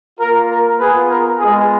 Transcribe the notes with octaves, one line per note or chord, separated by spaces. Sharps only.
A#3 F4 A#4
A#4
B3 F4 G#4 B4
A#4
G#3 B3 F4 G#4